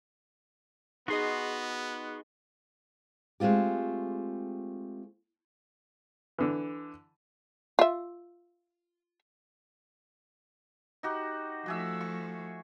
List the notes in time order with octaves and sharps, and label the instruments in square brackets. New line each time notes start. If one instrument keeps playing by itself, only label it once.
[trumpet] B3 [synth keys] D#4 G#4 D#5 [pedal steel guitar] F#4 C6
[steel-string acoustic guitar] G#3 A3 C4 F4 G4
[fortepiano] D3 E3
[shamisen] F4 E5
[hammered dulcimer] D#4 F#4 G4
[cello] F3 A3 [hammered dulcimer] F#4 G#4 E5
[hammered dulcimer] C#6